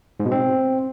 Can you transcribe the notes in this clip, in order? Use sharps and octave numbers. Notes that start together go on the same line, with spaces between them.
G#2
B2
C4